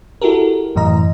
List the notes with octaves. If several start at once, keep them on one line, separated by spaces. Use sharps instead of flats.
E4 F#4 G4 A4 A#4
F#2 A2 E3 D#5 A#5